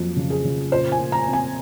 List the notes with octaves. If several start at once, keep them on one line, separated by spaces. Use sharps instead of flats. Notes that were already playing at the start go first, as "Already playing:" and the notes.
Already playing: F2 F#3 A#3
C#3
G#4
C#3
A#2 C5
G#5
A#2
A#5
C4
G#5